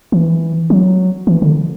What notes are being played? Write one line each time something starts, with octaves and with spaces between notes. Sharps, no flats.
E3
F#3
E3
D3